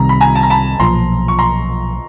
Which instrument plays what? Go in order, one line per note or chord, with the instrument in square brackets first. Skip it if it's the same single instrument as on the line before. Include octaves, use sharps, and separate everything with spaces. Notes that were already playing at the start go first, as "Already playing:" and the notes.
Already playing: [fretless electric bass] C2 C3 D#3 G3 [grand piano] A#5
[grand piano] B5
G#5 A#5
A5
A#5
A5 B5
[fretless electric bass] B1 A#2 F3 [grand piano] A#5 C6
[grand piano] C#6
A#5 C6